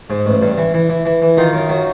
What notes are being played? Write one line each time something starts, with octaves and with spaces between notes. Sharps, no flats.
G#2
A1
G2
E3
E3
E3
E3
E3
D#3 D#4 F4
F#2
F#3